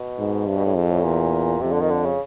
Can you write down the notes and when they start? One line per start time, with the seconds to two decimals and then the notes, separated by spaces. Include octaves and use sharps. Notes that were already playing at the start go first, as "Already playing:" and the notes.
Already playing: B2
0.18 G#2
0.47 G2 C3
0.56 B2
0.66 A2
0.75 F2 G#2
0.90 A2
1.04 E2 A#2
1.61 F2 C3
1.72 D3
1.81 D#3
1.90 D3
2.05 C#3